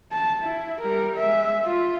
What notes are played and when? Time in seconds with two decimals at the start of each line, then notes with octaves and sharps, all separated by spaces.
0.12 A5
0.43 E4
0.81 G3 A#4
1.16 G#3 E5
1.65 F4